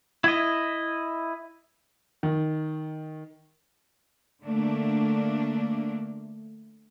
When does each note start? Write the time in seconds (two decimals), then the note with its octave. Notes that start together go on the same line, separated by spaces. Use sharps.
0.24 E4 D#5
2.23 D#3
4.43 D3 A3 A#3 D4